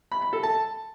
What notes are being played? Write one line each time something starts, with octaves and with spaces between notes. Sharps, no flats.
B5
B5
A4
A5